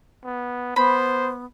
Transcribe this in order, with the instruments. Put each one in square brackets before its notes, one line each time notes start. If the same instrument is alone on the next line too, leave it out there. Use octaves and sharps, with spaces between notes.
[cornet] B3
[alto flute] B3 [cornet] C5 [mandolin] B5